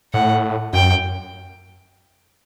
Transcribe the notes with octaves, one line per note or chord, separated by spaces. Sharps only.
A2 F#5
F#2 G5